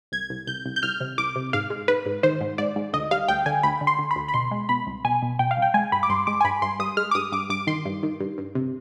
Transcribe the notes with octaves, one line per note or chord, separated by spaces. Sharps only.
C2 G#6
C2
C2 G6
C2
G6
C2 F6
C3
C2 D6
C3
G#2 F5
G#3
G#2 B4
G#2
D#3 C5
G#2
G#2 D5
G#2
D2 D#5
G3 F5
D2 G5
D3 G#5
D2 B5
D3
C6
D3
B5
D2
B5
B2 C6
G#3
B2 B5
C2
B2 G#5
B2
B2 G5
F5
C2
G5
G#3 G#5
G2 B5
D6
G2 C6
G#3 D6
G#5
G2 B5
G2 C6
G2 D#6
G#3 F6
D6
G2 D#6
G2 D6
G2 D6
D#3 C6
G2
D#3
G2
G2
C3